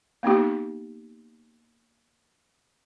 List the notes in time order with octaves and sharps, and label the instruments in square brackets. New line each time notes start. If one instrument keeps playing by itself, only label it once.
[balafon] A#3 B3 D#4 G4